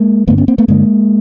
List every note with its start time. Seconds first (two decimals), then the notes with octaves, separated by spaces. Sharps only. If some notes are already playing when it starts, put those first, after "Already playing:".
Already playing: G#3 A#3
0.28 G2 D3 A3 B3
0.38 B3 C#4
0.48 A#3 C4
0.58 A3 B3
0.68 G2 D3 G#3 A#3